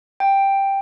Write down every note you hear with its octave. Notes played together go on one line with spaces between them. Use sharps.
G5